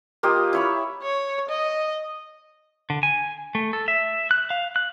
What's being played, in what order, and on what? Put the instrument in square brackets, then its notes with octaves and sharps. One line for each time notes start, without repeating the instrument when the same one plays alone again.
[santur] A#3 F4 G4 D#5
E4 C#5 B5
[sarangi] C#5
D#5
[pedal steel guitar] D3
G#5
A3
A4
E5
F#6
F5
F#6